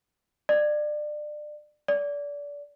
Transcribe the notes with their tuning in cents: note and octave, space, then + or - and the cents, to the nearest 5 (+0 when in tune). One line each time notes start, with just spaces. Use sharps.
D5 +25
D5 -25